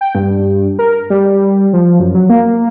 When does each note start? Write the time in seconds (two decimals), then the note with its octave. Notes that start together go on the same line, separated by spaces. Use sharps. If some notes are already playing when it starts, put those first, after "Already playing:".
0.01 G5
0.15 G2
0.79 A#4
1.10 G3
1.73 F3
2.00 F#2
2.15 F#3
2.29 A#3